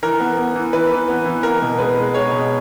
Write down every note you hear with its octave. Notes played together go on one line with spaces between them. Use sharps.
E3 A#4
B3
B3
E3
E3 B4
E3
B3
E3
B3 A#4
B2
G#3 B4
G#3
G#3 C#5
B2